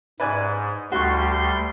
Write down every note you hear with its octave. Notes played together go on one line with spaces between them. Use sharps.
G#2 B4 D5 G#5
D2 G3 F#4 C6 C#6